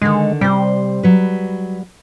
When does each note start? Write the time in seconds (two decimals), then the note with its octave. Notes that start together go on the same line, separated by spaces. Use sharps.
0.02 D3 D#3 G#3
0.41 C3 G3 C5
1.03 F#3 B4